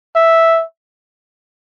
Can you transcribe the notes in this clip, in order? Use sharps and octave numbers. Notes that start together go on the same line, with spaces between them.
E5